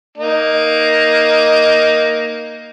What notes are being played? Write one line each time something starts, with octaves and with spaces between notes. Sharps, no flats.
A#3 D#4